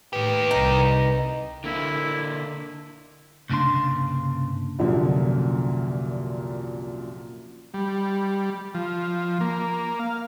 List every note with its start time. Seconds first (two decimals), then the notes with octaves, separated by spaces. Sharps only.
0.13 A2 D#3 G4 B4
0.51 C2 D#4
1.64 D3 A#3 E4
3.50 C2 G2 C#3 A#3 D4 C6
4.79 C2 F#2 A#2 D3 F3 A#3
7.74 G3
8.75 F3
9.41 A#3
9.99 F5